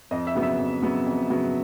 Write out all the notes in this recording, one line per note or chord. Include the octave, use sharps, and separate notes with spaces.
F2 D#5
E5
C#3 F#3 B3
E5
F2
C#3 F#3 B3
F2
C#3 F#3 B3